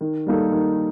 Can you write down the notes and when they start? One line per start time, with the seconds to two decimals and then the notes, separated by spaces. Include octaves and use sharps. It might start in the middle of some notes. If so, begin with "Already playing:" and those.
0.01 D#3
0.26 G3 A#3 D#4 A4
0.52 D#3